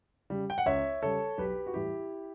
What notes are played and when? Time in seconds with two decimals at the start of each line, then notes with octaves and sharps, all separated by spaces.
0.30 C#3 G3
0.50 G5
0.58 F#5
0.66 C#2 C#5 E5
1.02 C#3 G3 A4 C#5
1.38 B1 G4 B4
1.67 F#4
1.74 A2 E3 G3 E4 G4